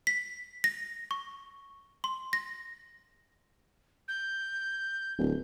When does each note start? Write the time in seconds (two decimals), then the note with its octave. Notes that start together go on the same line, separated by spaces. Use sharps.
0.07 B6
0.64 A#6
1.11 C#6
2.04 C6
2.33 A#6
4.08 G6
5.18 D1